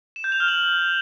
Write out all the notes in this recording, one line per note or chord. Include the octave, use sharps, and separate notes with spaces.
E7
G6
F7
F6
F#7